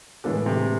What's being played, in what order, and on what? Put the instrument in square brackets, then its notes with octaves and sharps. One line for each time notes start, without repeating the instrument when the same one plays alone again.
[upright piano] A2 E3 G#3 B3 [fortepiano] D3
[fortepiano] C3